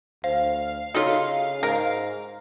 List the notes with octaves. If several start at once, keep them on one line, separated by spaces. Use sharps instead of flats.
D2 C5 F5
C#3 D#4 F4 F#4 A4 C#5
G#2 A#4